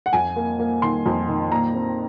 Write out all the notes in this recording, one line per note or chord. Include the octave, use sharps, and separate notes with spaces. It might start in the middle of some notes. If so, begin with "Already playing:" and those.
F#5
F2 G#5
A#3
A#3
D#3 C6
F2
D#3
A#2 A#5
C4